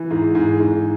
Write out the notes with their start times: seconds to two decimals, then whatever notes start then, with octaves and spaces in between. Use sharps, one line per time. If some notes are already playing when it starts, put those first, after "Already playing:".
Already playing: E3
0.11 G#2
0.35 G#2
0.60 G#2